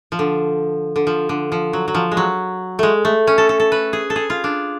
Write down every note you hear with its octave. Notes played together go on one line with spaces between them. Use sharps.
F3
D3
D3
F3
D3
F3
F#3
F#3
F3
G#3
F#3
G#3 A3
A3
C#4
A4
A4
A4
B4
G#4
A4
G#4
F4
D4